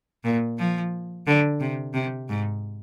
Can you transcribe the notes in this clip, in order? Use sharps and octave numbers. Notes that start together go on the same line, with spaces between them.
A#2
F3
D3
C3
C3
G#2